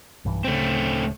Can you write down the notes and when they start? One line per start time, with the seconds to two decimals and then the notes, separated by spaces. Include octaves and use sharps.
0.25 B1 G2 E3
0.44 D1 C#3 A3 C4